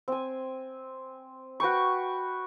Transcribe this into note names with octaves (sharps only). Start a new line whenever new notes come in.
C4 G#5
F#4 B4 G5 C#6